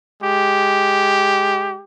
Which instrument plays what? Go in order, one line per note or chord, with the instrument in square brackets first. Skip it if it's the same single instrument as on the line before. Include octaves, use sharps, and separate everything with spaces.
[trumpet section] G#3 G4